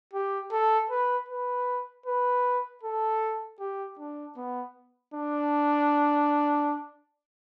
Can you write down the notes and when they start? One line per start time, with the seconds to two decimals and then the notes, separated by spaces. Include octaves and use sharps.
0.13 G4
0.52 A4
0.90 B4
1.28 B4
2.06 B4
2.83 A4
3.60 G4
3.99 D4
4.37 B3
5.14 D4